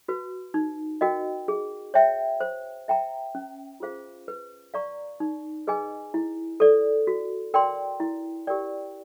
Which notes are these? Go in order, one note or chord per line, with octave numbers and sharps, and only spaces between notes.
F#4 B4
D#4
F#4 A#4 D#5 G5
G#4
C#5 E5 G5
C5
E5 G5 A#5
C#4
F4 G#4 C5 F5
B4
D5 F5 A#5 C#6
D#4
G#4 B4 D#5 G#5
E4
A4 D5
F#4
A#4 D5 G5 C6
E4
G4 A#4 D5 G5